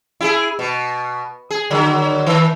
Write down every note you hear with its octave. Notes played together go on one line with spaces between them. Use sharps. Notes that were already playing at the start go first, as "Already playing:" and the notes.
E4 G4 G#4
B2
G#4
D3 F#3
D#3